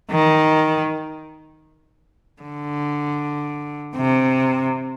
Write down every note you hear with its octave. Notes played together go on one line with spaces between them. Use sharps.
D#3
D3
C3